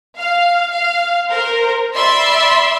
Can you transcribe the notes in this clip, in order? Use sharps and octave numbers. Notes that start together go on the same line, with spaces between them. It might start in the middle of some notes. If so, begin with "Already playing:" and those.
F5
F5
A#4 C5
D5 E5 B5 C6 E6